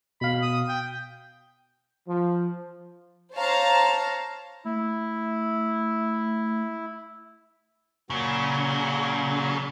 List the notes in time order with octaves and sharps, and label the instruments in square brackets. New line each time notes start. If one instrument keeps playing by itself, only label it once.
[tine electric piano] B2 F5 [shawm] B5
[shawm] D#6
G5
[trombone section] F3
[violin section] C5 C#5 F5 A5 A#5
[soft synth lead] A3 [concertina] E4
[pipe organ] A#2 F#3 [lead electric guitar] C#3